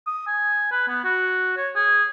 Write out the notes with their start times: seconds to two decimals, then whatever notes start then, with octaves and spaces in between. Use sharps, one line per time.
0.07 D#6
0.28 G#5
0.72 B4
0.88 B3
1.04 F#4
1.57 C#5
1.76 G#4